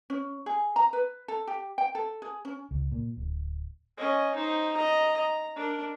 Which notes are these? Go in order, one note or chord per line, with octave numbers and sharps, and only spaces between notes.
C#4
G#4
A#5
B4
A4
G4
G5
A4
G#4
C#4
C#2
A#2
D1
C#4 D#5
D#4 C5
D#5 A#5
A#5
D4 A#4